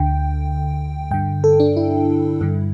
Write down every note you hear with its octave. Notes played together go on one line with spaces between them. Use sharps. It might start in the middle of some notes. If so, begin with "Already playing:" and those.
Already playing: D2 D3 G5
G2 D3 G5
A4
D4
E4
G2 D3